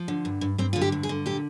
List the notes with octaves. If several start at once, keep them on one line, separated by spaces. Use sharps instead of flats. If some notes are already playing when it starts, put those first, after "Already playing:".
Already playing: F3
D3
G2
G2
G2 C4
D3 F4
G4
G2
G#4
D3
A#2 G4